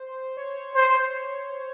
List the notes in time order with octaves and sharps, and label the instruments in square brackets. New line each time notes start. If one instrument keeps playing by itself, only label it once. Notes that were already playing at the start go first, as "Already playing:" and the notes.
Already playing: [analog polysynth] C5
C#5
[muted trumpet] C5